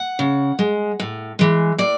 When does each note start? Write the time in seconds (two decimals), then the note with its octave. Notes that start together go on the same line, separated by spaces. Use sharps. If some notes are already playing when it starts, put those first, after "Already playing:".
Already playing: F#5
0.19 C#3
0.59 G#3
1.00 A2
1.39 E3 G#3
1.78 A2 D5